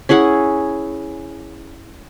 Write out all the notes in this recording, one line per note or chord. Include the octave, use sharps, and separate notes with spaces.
C#4 E4 G#4 F#5